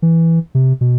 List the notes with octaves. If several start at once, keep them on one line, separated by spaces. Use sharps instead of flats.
E3
C3
B2